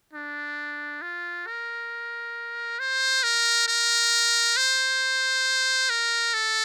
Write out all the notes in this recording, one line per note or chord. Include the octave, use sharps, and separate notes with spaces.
D4
F4
A#4
C5
A#4
A#4
C5
A#4
A4